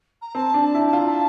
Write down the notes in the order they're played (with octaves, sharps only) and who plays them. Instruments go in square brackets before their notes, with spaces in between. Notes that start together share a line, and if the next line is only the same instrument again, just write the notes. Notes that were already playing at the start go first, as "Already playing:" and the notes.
[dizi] A#5
[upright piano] C4 [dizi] A5
[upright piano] D4
[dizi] A5
[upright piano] E4
[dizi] A5
[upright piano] F4
[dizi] A#5
A5